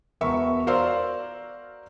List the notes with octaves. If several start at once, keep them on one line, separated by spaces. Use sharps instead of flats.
E1 B3 A#4 E5 C#6
F#4 A#4 C5 D5 F5 E6